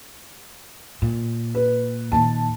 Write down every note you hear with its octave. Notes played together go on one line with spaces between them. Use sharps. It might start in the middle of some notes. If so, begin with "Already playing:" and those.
A#2
B4
D#2 A#2 A5